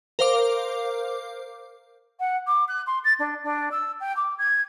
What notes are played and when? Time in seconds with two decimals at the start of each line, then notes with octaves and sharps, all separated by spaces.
0.19 A#4 C5 F5 D6
2.19 F#5
2.46 D6
2.68 F#6
2.86 C6
3.04 A6
3.19 D4
3.43 D4
3.71 E6
4.00 G5
4.16 D6
4.38 G#6